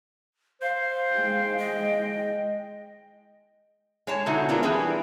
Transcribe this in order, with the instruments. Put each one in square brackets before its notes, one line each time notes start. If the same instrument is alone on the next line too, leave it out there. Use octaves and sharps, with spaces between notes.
[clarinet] C5 [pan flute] F5
[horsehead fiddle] G#3 G5
[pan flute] D#5
[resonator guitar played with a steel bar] G#3 C#5 A5
B2 D3 D#4 E4 F#4
G#3 B3 D4 F4 A#4
E3 G3 E4 G#4 B4 G5